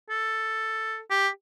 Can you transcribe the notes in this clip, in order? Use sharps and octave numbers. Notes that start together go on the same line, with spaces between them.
A4
G4